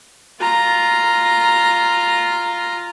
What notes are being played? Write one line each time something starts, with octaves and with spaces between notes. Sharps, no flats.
F4 A#5